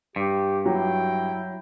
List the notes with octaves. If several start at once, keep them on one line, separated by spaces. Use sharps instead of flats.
G2 G4
F#3 E4 G5